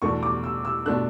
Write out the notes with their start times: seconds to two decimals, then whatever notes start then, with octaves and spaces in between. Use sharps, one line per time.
0.02 E2 B2 A3 D4 C#6
0.23 D6
0.44 E6
0.65 E6
0.86 B2 A3 D4 F#6